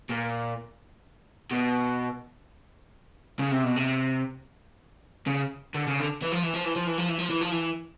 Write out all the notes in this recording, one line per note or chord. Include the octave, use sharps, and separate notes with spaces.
A#2
B2
C#3
C3
B2
C3
C#3
D3
C#3
D3
E3
F3
E3
F3
E3
F3
E3
F3
E3
F3
E3
F3
E3